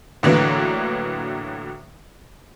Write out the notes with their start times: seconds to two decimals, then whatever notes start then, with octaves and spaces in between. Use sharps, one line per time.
0.23 A2 D3 E3 F#3 A#3